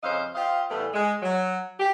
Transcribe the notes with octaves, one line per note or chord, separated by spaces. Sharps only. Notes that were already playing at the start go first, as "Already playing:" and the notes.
F2 C#3 C#4 C5 D#5 F5
F4 G4 C5 D#5 F5
A2 E3 G3 A3 B3
G#3
F#3
G4